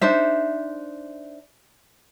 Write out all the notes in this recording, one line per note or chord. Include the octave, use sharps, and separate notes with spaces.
D4 D#4 C5 E5